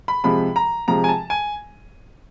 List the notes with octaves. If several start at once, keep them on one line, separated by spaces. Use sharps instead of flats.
B5
C3 F3 G#3 B5
A#5
C3 F3 G#3 A#5
G#5
A5
G#5